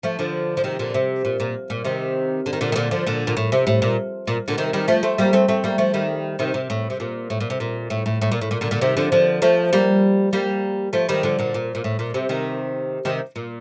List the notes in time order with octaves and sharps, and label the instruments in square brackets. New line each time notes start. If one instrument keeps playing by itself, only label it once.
[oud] F3 A3
D3 F3
F3
C3 D#3
A#2 D3
C3
A#2
A#2
A#2
C3 D#3
D3
D#3
A#2 D3
D#3
A#2 D3
D3 F3
A#2 D3
A#2
A2
C3
A2
A#2
A#2
A#2 D3
C3 D#3
D#3 G3
F3 A3
A3 C4
G3 A#3
A3 C4
A3 C4
G3 A#3
F3 A3
D#3 G3
C3 D#3
C3
A2
C3
A#2
A2
A#2
C3
A#2
A2
A2
A2
A#2
A2
A#2
A#2 D3
A#2 D3
C3 D#3
D3 F3
D3 F3
F3 A3
G3 A#3
G3 A#3
F3 A3
D#3 G3
D3 F3
A#2 D3
A#2
A#2
A2
A#2
C3
C3 D#3
C3 D#3
A#2